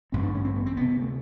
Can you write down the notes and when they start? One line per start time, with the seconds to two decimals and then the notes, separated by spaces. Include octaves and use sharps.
0.12 A1 G2 D3 C4
0.23 D4
0.34 C#4
0.45 C4
0.56 B3
0.66 C4
0.77 D2 C3 B3
1.01 A3